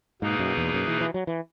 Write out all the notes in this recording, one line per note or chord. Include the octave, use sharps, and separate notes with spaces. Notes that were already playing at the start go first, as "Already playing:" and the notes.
G#2 B2 A#3 D#4 G#4 B4
F#2
E2
F#2
E3
E3
F#3
E3